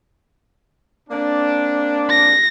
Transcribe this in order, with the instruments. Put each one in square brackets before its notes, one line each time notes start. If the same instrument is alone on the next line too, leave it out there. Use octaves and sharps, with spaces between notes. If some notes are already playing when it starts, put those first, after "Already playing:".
[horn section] A#3 C4 D4
[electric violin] A#6